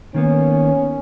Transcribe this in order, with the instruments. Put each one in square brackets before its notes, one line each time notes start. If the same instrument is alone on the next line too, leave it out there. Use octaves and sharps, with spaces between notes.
[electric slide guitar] D#3 A#3 B3 [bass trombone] C#4